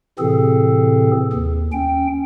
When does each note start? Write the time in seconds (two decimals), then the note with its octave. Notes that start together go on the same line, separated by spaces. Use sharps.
0.19 A2 C3 E3 C4 G#4 A4
1.33 D#2
1.72 C#4 G5